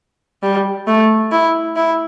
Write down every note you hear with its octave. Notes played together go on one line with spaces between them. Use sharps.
G3
A3
E4
E4